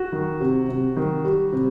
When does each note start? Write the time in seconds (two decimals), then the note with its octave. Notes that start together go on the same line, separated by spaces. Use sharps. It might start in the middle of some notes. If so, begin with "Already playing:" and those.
Already playing: F#4
0.12 D#3
0.40 C3
0.69 C3
0.96 D#3
1.25 G3
1.52 C3